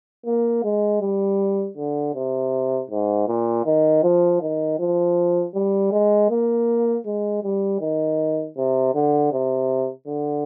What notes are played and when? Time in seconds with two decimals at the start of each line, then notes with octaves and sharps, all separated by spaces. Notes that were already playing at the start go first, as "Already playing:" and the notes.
0.26 A#3
0.64 G#3
1.01 G3
1.77 D3
2.15 C3
2.91 G#2
3.28 A#2
3.66 D#3
4.03 F3
4.42 D#3
4.79 F3
5.55 G3
5.92 G#3
6.30 A#3
7.06 G#3
7.44 G3
7.81 D#3
8.57 C3
8.95 D3
9.32 C3
10.07 D3